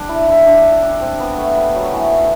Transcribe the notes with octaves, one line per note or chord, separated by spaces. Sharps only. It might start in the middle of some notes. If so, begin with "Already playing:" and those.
Already playing: G3 D4
E4
E4
D4
D4
C4
B3
A3
G3
F#3
E3